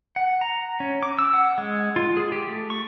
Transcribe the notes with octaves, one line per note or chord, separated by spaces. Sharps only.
F#5
A#5
C#4
D6
E6
F#5
G#3
F4
G#4
G4
A3
C#6